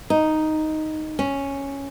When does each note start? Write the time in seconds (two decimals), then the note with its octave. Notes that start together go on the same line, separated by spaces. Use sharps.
0.10 D#4
1.19 C#4